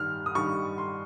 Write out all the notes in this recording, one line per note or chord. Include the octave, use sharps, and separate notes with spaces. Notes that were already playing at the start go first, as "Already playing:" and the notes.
Already playing: G2 D#3 G3 F6
D#6
G2 D#3 G3 C#6
C6